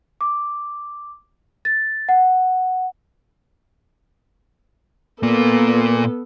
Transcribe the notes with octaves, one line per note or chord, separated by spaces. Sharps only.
D6
A6
F#5
A#2 A#3 B3 A4